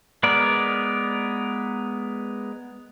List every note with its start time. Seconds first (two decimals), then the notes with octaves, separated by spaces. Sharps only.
0.23 G#3 B3 A#4 D5